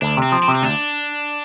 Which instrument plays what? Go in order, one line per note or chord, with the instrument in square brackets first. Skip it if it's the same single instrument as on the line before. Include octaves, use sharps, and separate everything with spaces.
[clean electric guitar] D2 [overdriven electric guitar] D4
[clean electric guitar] C3
[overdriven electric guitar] C4
[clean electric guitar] F3
[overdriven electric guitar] C4
[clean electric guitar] C3
[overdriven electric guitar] C4
[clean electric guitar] D2 [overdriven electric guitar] D4